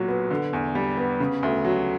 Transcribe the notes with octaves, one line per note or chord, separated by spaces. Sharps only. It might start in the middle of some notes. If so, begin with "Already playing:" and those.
Already playing: B1 A#2 F#3
B3
D3
E2
G3
B3
C#3
D2
F#3